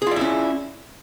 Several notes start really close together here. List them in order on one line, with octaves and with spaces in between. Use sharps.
G#4 F4 D5 E4 C#4